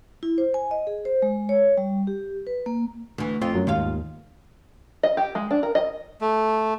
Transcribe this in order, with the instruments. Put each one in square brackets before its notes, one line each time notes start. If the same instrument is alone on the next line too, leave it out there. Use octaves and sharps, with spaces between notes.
[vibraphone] E4
C5
G#5
D#5
G#4
C5
G#3
C#5
G3
G4
B4
A#3
[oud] D2 E3
[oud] F2 F4 [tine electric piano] C4
[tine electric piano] F#2 F#3
[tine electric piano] D#2 [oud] G#2 F4 F5
[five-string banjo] D#5
G4
G#3
D4
A#4
D#5
[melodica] A3